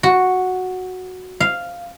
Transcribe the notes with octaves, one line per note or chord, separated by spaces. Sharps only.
F#4
F5